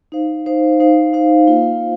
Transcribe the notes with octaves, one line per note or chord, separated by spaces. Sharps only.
D#4 C5 F5
D#4 C5 F5
D#4 C5 F5
D#4 C5 F5
A#3 F4 C5 F5
A#3